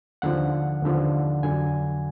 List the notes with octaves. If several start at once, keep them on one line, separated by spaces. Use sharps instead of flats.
D#2 D3 F3 F#5
D#2 D3 F3
F2 D3 F#3 G#5